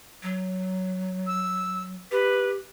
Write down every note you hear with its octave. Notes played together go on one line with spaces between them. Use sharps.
F#3
E6
G4 B4